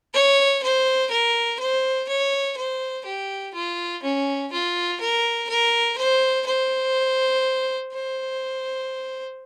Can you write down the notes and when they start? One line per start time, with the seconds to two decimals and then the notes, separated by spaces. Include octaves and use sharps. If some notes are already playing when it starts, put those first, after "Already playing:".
0.14 C#5
0.63 C5
1.11 A#4
1.60 C5
2.09 C#5
2.57 C5
3.06 G4
3.55 F4
4.03 C#4
4.52 F4
5.01 A#4
5.49 A#4
5.98 C5
6.47 C5
7.93 C5